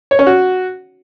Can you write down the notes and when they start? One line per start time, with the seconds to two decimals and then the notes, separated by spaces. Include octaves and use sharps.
0.11 C#5
0.19 C#4
0.27 F#4